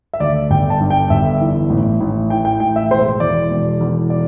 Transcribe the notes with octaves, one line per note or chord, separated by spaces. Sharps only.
E5
D2 D5
G1 G5
A5
G2
G5
G1 E5
E3
A1
A1
E3 G5
G5
A1 G5
E5
E1 C5
E2 D5
E1
E2
D5